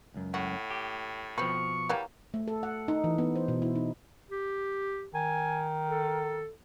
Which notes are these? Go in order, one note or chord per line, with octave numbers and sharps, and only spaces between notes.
C#2 F#2
A2 F#4
G4
B2 F3 C4 B4 C#6
E3 F#3 G3 A#3
A3
A4
F#5
D#4
E3
B3
C5
B2
E4
D#4
G4
D#3 G#5
A4